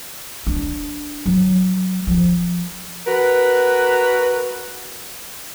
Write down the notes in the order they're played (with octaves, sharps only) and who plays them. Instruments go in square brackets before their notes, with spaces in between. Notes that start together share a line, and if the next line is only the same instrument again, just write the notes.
[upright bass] D4
F#3
F3
[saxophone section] F#4 A#4 B4